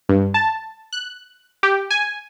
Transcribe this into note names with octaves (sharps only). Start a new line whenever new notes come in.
G2
A5
F#6
G4
G#5